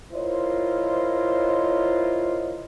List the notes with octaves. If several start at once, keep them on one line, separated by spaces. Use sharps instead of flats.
E4 F4 A#4 C5 C#5 D#5